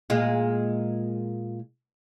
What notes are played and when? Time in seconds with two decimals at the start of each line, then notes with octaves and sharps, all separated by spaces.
0.10 A#2 G#3 F4